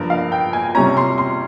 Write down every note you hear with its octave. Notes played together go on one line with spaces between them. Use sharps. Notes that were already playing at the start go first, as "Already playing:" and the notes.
Already playing: G2 F3 A#3 A#4
F5
G5
G#5
C3 G3 C#4 A#5
C6
C6